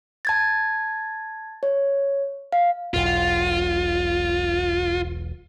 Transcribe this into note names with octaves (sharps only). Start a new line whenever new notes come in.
A5 G#6 A6
C#5
F5
E1 B1 F4